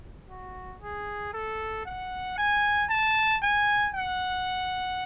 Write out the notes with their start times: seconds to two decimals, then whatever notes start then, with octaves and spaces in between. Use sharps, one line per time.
0.29 F#4
0.82 G#4
1.34 A4
1.86 F#5
2.38 G#5
2.90 A5
3.42 G#5
3.95 F#5